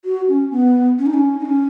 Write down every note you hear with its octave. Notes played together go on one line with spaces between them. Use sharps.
F#4
C#4
B3
C#4
D#4
C#4
D#4
C#4